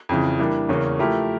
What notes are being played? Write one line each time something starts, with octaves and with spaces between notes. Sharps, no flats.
F2 C#3 E3
E3 G3 A#3 D4
E2 C#3 E3 A#3 C#4
F3 A3 E4 G4 A#4